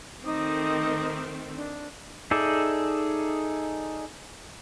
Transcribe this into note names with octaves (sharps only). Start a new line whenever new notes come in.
D#3 A3 C4 D#4 D6 D#6
D4
D#4 G#4 A4 D5 E5